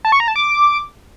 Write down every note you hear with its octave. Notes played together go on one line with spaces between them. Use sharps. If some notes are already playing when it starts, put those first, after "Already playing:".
A5
C#6
A#5
A5
D6